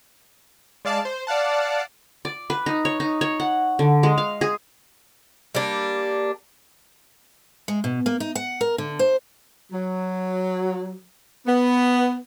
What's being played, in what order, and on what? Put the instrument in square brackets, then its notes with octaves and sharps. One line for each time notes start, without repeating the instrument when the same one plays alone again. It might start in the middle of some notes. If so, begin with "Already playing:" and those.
[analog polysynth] G#3 D5 F5 A5
C5
D5 F5 F#5 A5
[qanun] D5
B4
D#4
C#5
D#4
C#5
F#5
D3
G#3
F5
G#4
[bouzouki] G3 A#3 D4
[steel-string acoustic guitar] G#3
B2
A#3
D#4
F#5
A#4
D3
C5
[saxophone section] F#3
B3